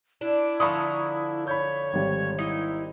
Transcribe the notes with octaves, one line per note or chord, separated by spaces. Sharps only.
D4 E4
D3 F3 A#5 B5 C#6 D#6
C#5 B5 G6
G#1 G3
D#4 E4